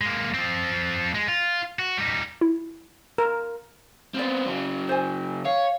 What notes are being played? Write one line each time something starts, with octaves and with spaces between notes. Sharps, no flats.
G#3 A#3
F3 C4
G#3
F4
F#4
G3 D#4
E4
A#4
B3 C4 F4 D5
C#3 F#3
C5 G#5
C#5 F5